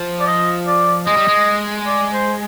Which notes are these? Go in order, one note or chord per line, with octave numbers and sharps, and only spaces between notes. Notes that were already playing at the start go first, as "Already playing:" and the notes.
Already playing: F3
D5
D#5
D5
G#3 D#5
G3
G#3
D5
C5